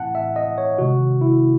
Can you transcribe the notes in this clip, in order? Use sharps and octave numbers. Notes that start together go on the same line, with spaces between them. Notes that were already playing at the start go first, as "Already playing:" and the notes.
Already playing: A2 E3 A3 C4 E4 F#5 A5
E5
D#5
C#5
C3 D#3 G#3 F#4
E4